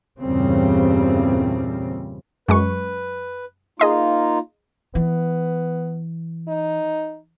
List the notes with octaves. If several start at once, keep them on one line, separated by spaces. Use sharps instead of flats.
E2 G2 A#2 C#3 G3 C4
F#2 G#3 B4 C#6
A#3 D#4 F4 G#4 D#5 C6
E3 B3
D#4